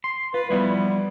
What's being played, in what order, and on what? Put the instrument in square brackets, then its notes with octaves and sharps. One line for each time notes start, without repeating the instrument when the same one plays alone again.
[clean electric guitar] C6
[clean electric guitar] F4 [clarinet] B4
[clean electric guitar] F3 B3 E4 [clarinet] G3